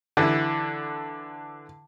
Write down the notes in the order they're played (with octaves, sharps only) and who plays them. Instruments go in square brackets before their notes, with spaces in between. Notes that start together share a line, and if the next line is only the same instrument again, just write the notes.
[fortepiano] D3 E3